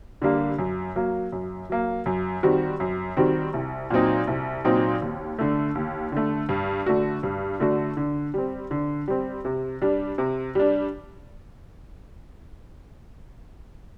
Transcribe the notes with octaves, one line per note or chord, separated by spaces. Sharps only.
D3 G3 A#3
F#2
F#3 A#3
F#2
F#3 A#3
F#2
D#3 G3 C4 F#4
F#2
D#3 G3 C4 F#4
C2
A#2 F#3 C4 D#4
C2
A#2 F#3 C4 D#4
D#2
D3 A3
D#2
D3 A3
G2
D3 A3 D4 F#4
G2
D3 A3 D4 F#4
D3
G3 C4
D3
G3 C4
C3
G3 D4
C3
G3 D4